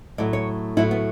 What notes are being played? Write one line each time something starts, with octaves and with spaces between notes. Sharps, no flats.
A2 F#3 D5
C#5
A2 F#3 E4
B3